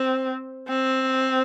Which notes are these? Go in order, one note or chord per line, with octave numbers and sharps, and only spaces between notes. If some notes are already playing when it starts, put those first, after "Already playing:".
Already playing: C4
C4